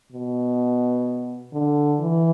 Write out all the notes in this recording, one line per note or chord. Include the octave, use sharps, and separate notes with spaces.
B2
D3
E3